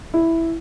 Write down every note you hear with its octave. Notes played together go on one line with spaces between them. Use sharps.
E4